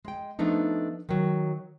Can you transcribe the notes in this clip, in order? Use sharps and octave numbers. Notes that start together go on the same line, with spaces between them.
G#3 G5
F3 A3 B3 D4 D#4
D#3 F#3